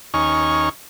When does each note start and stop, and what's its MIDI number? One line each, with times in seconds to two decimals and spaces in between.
0.14 0.69 39
0.14 0.69 61
0.14 0.69 63
0.14 0.69 80
0.14 0.69 85
0.14 0.69 89